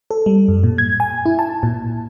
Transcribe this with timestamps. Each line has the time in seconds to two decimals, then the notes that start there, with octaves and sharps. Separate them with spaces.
0.11 A4
0.26 G3
0.48 F#2
0.64 A#2
0.78 G#6
1.00 G#5
1.26 E4
1.39 A5
1.63 A#2